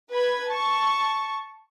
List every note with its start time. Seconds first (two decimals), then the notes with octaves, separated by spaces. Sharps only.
0.11 B4 B5 G#6
0.49 A5 C#6